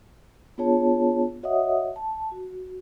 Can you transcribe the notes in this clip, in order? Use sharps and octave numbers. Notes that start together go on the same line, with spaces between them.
B3 D4 F4 G#4 C#5 A5
F#4 C#5 D#5 E5 F#5 D#6
A5
F#4